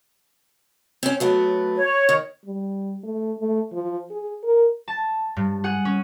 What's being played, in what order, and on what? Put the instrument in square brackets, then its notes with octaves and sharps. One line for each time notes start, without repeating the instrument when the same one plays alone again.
[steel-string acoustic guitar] C4 C#4
F#3 A3 B3
[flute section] C#5
[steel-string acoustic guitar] D#3
[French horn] G3
A3
A3
F3
G#4
A#4
[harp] A5
G2
G#4 F#5
C#4